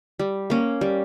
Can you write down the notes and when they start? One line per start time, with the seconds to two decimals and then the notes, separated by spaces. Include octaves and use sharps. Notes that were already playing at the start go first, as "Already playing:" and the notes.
0.19 G3
0.50 A#3 C#4
0.81 G3